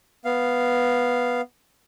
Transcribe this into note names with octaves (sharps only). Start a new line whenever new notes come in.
B3 F5